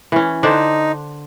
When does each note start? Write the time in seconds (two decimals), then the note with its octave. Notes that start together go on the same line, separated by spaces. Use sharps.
0.12 E3 C#4
0.43 D3 D4 D#4 C5